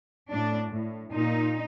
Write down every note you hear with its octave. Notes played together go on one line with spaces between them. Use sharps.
A2 D4
A2
A#2 D#4